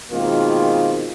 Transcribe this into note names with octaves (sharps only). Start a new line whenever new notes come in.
B2 D#3 G#3 A#3 C4 F4